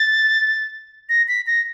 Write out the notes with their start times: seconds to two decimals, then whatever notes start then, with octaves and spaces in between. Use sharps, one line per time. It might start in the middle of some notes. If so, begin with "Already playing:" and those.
Already playing: A6
1.09 A#6
1.28 B6
1.47 A#6